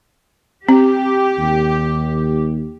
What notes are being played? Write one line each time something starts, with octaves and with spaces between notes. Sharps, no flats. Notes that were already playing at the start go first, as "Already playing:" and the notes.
C4 G4
D#2